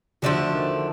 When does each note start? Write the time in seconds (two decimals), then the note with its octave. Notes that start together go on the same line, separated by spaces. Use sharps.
0.22 D3 F3 A3 D4 F#4
0.53 D#3